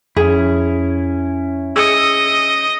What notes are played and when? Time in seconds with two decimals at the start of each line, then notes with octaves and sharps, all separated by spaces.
0.17 F2 C#4 E4 G#4
1.76 G#4 D#5 E6 C#7